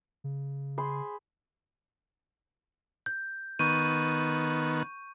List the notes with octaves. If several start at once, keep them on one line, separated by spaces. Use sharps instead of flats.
C#3
G#4 C5 B5
G6
D#3 B3 C#6 G6 D#7